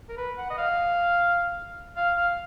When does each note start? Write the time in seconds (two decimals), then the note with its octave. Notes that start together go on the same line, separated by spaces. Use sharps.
0.09 A#4
0.17 B4
0.38 F#5
0.50 D#5
0.58 F5
1.97 F5
2.17 F5